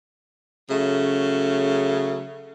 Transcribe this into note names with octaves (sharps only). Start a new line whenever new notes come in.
C#3 F#3 A3